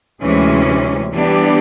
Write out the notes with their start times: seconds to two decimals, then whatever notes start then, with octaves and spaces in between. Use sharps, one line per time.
0.22 D2 C3 E3 G#3 C#4
1.13 E3 G3 B3 D4 G4